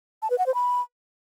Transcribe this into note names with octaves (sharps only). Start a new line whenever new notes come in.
A5
B4
F#5
C5
B5